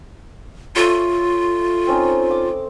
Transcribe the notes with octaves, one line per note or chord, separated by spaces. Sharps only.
A3 F4 C#5
C4 C#4 D#4
D6